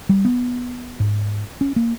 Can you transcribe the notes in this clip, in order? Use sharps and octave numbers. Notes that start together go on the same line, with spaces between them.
G3
B3
G#2
C#4
A#3